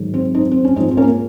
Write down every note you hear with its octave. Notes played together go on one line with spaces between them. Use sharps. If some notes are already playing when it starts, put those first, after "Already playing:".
Already playing: G#2 D#3 F#3
C4
C4 D#4
C4
C#4
G#2 F3 C4 D#4
C4
A#3 C#4